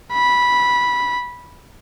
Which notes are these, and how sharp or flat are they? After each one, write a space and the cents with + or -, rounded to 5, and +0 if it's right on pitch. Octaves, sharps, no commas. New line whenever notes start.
B5 -10